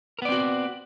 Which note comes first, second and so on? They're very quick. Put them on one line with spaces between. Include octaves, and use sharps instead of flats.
A#4 B3 D5 C4 F#4